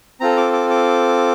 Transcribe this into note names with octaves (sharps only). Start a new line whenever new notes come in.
C4 F4 A4 A#5
D6
D6
D6